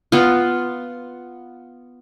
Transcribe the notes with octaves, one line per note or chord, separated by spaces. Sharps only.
B3 F4